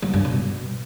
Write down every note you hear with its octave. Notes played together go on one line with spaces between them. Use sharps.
F#3
G2
B2